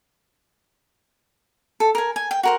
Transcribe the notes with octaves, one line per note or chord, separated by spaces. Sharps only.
A4
A#4 G#5
G#5
G5
F#4 A#4 C5